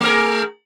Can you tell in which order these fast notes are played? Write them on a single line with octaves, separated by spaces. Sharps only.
A3 A#4 G#4